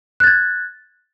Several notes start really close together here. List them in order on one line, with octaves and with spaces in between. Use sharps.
F#6 A6 G#6